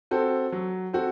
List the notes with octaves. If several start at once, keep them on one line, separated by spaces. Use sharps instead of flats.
C4 F#4 A4 C5
F#3
C4 F#4 A4 C5